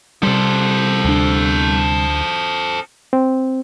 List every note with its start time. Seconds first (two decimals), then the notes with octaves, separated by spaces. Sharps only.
0.23 C3 G3 A4 C5
1.05 D2 D4
3.13 C4